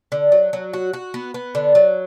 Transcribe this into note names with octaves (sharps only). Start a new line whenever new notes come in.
D3
F#3
F#3
F#4
F#4
B3
B3
D3
F#3